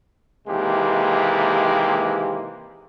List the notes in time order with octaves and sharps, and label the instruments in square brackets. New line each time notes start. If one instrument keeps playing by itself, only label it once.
[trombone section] D#2 C3 E3 G#3 A#3 G4